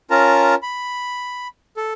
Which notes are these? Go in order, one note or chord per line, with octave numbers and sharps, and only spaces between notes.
C#4 F4 A#4 A5 A#5
B5
A4